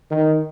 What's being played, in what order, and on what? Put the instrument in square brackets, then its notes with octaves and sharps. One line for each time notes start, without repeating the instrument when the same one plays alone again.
[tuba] D#3